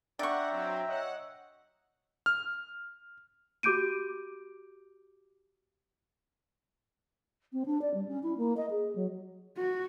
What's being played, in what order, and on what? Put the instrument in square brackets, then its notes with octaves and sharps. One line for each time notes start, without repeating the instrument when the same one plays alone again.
[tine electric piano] D4 [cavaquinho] D5 C#6 [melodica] E5 G5 A#5 [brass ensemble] F#5
[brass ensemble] F#3 C4
[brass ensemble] C#5 F#5 [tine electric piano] D#5 E6
[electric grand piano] F6
[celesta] F#4 G4 D6 G6 D7 D#7
[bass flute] C4
D4
D5
G3
C#4
E4
A#3
D#5
G#4
F#3
[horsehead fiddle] F#4